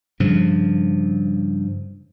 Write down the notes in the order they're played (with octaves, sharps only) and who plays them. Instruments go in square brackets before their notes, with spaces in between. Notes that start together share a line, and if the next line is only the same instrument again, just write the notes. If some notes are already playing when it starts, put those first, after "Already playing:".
[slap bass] G2 C#3 F3